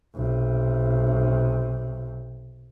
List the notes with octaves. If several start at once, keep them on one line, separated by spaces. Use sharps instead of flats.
B1 C3